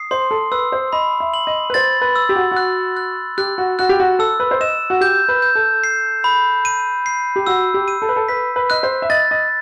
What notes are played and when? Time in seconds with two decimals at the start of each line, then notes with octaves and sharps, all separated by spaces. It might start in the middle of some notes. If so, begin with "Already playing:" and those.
Already playing: D#6 C7
0.11 C5 C6
0.31 A4
0.52 B4 E6
0.72 C5
0.93 D#5 B5
1.20 E5
1.34 F#7
1.47 D#5
1.70 B4
1.74 C5 A6
2.01 B4
2.16 E6
2.29 G4
2.36 F#4
2.51 F#4
2.57 F#6
2.97 F#6
3.38 G4 F#6
3.58 F#4
3.79 F#4 F#6
3.89 G4
4.00 F#4
4.19 A4 E6
4.40 B4
4.51 C5
4.60 D#5 E7
4.90 F#4
5.01 G4 G6
5.29 B4
5.42 G6
5.55 A4
5.84 C7
6.24 B5
6.65 D#7
7.06 C7
7.36 G4
7.46 F#4 E6
7.74 G4
7.88 D#7
8.02 A4
8.09 B4
8.16 A4
8.28 B4 B6
8.56 B4
8.70 D#5 F#6
8.83 C5
9.02 E5
9.10 D#5 A6
9.31 D#5